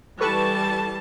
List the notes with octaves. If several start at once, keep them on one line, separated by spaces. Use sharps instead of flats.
E3 G3 A4 B4 A5 C#6